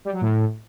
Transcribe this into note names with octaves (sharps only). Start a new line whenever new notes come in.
G3
F#3
A2